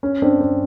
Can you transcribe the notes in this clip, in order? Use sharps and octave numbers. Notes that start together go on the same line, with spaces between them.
C#4
C4 D4
C4